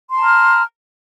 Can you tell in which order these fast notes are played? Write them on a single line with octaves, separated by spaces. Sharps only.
C6 A5 A#5 F6